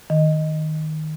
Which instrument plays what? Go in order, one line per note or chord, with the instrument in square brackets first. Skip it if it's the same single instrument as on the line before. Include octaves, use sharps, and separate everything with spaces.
[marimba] D#3 D#5